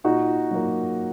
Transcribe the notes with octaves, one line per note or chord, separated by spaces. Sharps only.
A#2 D#4 F#4
F#3 A#3